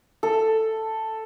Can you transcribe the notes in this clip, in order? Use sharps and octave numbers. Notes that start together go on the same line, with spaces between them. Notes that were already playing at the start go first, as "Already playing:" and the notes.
A4